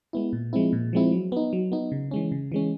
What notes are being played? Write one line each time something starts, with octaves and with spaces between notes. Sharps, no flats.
G#3 B3 E4
A#2
F3 G#3 C4 E4
A#2
F3 G#3 C4 E4
F#3
B3 D#4
F#3
B3 D#4
C#3
E3 G#3 C#4
C#3
E3 G#3 C#4